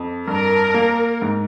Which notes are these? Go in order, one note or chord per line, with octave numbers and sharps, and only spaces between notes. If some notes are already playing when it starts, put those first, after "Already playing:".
Already playing: F2
G2 A#4
A#3
G#2